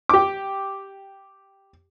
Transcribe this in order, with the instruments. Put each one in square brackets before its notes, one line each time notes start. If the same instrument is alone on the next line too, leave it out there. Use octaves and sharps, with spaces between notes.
[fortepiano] G4 D6